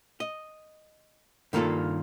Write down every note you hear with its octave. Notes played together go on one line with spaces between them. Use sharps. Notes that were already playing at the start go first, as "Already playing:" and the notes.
D#5
G2 D#3 A#3 D#4 F4 A4